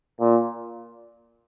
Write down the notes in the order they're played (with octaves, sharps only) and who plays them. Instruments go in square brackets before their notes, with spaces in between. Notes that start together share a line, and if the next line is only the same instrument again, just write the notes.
[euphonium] A#2